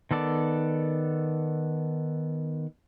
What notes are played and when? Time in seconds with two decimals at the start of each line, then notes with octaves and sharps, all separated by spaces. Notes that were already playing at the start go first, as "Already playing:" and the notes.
0.11 D#3 B3 A4 D5